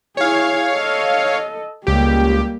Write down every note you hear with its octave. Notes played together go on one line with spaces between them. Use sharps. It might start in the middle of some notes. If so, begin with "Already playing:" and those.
E4 G#4 C#5 F5
A4 D#5
C#2 G3 A#3 G4